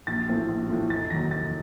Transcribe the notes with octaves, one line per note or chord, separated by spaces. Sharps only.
A#1 A6
A2 F3 A3 C4
A#1
A2 F3 A3 C4
F1 A6
D#2 D#3 F#3 A#6
F1 A6